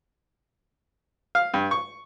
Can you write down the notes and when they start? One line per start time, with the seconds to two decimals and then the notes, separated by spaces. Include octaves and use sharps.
1.35 F5
1.54 G2
1.71 C#6